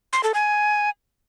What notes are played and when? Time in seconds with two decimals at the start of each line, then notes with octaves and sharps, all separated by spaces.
0.13 C6
0.24 A4
0.34 G#5